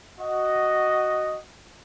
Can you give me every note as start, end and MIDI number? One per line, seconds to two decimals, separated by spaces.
0.20 1.37 66
0.20 1.37 75